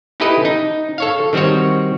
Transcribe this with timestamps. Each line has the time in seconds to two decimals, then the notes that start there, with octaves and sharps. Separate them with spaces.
0.20 D#4 E4 G4 A4 B4 D#5
0.45 D#4
0.98 A4 C#5 F5
1.33 D#3 G3 C4 F#4 C#5